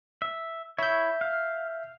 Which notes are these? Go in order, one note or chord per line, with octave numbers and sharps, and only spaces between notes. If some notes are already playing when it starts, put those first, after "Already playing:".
E5
E4 C#5 E5 G6
F5